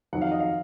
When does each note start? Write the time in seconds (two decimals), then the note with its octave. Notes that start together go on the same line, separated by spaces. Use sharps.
0.13 F2 D#3 F#3 F#5
0.21 F5
0.32 D#5
0.40 F5